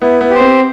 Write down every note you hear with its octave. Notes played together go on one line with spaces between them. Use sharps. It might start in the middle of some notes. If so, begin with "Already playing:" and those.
B3 E4
B3
G4 C5
C4